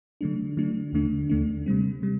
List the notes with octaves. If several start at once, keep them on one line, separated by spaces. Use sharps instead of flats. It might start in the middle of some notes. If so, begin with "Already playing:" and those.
D3 F#3 A3 D4
D3 F#3 A3 D4
D#2 D3 A3 D4
D#2 D3 A3 D4
C3 G3 C4
C3 G3